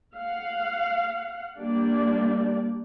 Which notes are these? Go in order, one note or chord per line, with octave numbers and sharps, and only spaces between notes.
F5 F#5
G3 A#3 D4 G4 D5